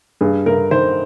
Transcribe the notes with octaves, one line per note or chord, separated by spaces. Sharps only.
G2 G#4
G2 A#4
D#3 C5